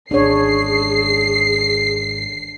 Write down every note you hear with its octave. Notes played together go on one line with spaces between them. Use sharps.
G#1 C#4 D4 G#4 C#5 C7